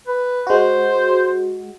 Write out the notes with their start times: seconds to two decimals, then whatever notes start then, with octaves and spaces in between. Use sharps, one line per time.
0.07 B4
0.47 G#3 F#4 C5